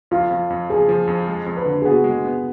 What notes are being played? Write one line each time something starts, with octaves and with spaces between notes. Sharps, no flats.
F2 F4
F2
F2
F3 G#4
F3
F2
G#3
F2
B4
D3
G#4
B3 F#4
G#3
B3